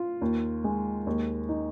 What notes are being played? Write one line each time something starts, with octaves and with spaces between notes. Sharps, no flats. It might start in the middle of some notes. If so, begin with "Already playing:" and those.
Already playing: F4
D#2
G#3
D#2
D#4